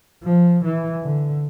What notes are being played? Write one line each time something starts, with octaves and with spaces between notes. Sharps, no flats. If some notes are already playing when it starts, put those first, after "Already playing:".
F3
E3
D3